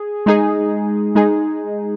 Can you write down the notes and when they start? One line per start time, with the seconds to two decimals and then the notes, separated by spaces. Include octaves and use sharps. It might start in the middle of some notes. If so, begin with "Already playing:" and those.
Already playing: G#4
0.26 G#3 D#4 G#4
1.15 G#3 D#4 G#4